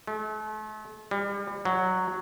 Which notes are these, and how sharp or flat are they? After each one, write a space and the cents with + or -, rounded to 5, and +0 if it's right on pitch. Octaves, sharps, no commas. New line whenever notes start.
A3 -40
G3 +35
F#3 +0